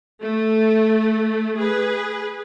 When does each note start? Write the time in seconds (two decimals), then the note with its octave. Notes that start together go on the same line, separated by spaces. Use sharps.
0.21 A3
1.56 G#4 B4